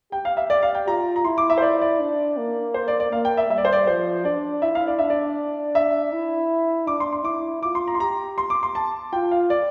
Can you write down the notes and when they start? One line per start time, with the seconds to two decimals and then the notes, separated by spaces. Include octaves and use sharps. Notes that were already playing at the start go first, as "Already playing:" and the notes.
0.12 G4 G5
0.25 F5
0.37 E5
0.50 D5
0.63 F5
0.75 G5
0.87 F4 A#5
1.16 A#5
1.25 E4 C6
1.38 D6
1.50 E5
1.58 C5
1.62 D5
1.81 D5
2.00 D4
2.37 A#3
2.74 C5
2.88 D5
3.00 D5
3.12 A#3 F5
3.25 G5
3.37 E5
3.50 G3 E5
3.58 D5
3.65 C5
3.73 D5
3.87 F3 C5
4.25 D4 D5
4.62 E4 E5
4.75 F5
4.87 D5
4.99 D4 E5
5.10 D5
5.75 E5
6.12 E4
6.87 D4 D6
7.00 C6
7.13 C6
7.25 E4 D6
7.63 F4 D6
7.75 C6
7.88 A#5
7.95 C6
8.00 G4 A#5
8.38 C6
8.50 D6
8.63 C6
8.75 A5
9.13 F4 G5
9.31 F5
9.50 D5